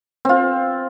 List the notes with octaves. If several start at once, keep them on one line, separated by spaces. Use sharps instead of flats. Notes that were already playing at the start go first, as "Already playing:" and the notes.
C4 F4